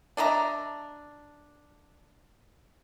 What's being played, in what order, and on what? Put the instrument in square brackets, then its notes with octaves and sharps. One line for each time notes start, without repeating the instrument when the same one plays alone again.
[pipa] D4 D#5 E5 A#5